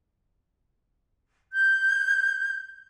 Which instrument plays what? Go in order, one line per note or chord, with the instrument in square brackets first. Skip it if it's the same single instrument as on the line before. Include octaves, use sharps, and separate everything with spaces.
[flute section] G6